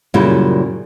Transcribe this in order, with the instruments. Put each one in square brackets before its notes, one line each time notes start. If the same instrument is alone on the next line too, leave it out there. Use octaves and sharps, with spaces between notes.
[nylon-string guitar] F#2 A#2 C#3 G3 E4